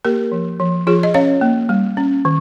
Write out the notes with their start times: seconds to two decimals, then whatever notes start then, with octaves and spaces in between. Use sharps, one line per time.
0.05 A#3 G4 A#4
0.32 F3
0.60 F3
0.87 F3 F4 G#4
1.03 D#5
1.14 C#4 C#5 F5
1.41 A#3
1.69 G3
1.97 C#4
2.25 D#3